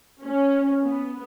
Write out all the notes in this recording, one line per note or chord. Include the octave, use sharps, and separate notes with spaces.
C#4
B3